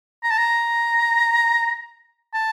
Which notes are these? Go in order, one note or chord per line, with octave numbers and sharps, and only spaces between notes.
A#5
A5
A#5
A5